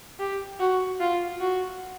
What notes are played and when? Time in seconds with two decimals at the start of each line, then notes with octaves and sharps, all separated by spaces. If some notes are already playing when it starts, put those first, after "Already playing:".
0.19 G4
0.60 F#4
1.00 F4
1.40 F#4